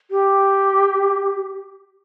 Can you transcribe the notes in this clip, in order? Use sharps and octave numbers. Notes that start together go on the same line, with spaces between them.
G4